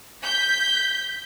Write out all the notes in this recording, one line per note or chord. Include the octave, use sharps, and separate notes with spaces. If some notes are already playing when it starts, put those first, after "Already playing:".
G6 B6